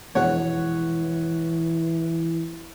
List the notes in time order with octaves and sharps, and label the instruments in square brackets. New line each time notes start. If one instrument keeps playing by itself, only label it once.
[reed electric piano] F2 B2 G#3 [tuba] E3 [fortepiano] C#5 F#5